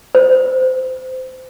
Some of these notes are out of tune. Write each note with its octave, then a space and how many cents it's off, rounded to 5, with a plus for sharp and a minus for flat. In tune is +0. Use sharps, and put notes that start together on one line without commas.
C5 -20